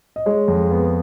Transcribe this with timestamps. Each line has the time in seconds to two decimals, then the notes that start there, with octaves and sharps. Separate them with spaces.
0.16 D#5
0.26 G#3 C#5
0.48 F2
0.71 B3